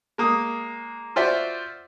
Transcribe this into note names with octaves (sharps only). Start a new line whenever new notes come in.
G#3 A#3 D#6
F4 F#4 C5 D5 E5